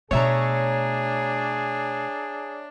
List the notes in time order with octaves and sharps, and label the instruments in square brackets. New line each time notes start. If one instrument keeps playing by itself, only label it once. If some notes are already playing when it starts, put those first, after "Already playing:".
[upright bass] B2 A3 [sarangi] D4 [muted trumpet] G#4 [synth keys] C#5 E5 A#5